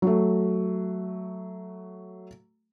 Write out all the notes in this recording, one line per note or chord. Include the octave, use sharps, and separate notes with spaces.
F#3 A3